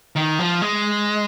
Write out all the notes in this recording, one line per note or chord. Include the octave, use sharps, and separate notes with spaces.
D#3
F3
G#3